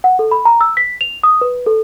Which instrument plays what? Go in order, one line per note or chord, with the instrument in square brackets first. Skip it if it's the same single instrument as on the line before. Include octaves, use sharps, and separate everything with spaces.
[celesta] F#5
A4
B5
A#5
E6
B6
F7
D#6
B4
A4